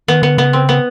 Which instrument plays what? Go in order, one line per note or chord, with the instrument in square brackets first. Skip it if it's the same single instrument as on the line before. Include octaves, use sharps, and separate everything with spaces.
[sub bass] D#3 [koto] B3
[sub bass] D3 [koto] B3
[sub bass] C#3 [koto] B3
[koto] C4
B3